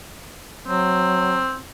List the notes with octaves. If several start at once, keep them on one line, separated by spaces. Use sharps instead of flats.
F#3 C4